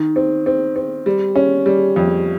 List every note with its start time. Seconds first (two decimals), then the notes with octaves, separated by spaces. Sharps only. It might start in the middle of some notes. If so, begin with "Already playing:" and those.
Already playing: D#3
0.16 C4
0.46 C4
0.76 C4
1.06 G3
1.36 C#4
1.66 G3
1.96 F2